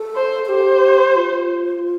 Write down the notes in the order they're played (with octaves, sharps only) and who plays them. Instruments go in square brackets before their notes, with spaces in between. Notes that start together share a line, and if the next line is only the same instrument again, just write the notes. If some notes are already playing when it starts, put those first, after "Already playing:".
Already playing: [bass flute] A4
[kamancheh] C5
[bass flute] A4
[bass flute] G4 [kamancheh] C5
[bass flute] F4